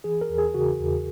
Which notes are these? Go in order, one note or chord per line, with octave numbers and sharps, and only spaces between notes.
E3 G#4
A#4
E2
G#4
C#3 F#4
E2